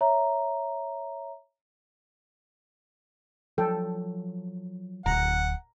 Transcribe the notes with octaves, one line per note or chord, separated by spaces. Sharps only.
C#5 E5 A#5
F3 F#3 A4 G5
D1 F#5 A#5